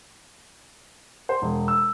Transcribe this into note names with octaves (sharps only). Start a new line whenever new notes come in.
C5
E1
E6